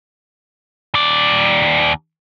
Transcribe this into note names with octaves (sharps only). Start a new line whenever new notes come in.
D#2 D5